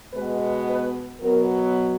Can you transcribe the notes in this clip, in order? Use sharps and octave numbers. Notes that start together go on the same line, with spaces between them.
B2 G#3 B3 B4
B4
B2 F#3 B3 A#4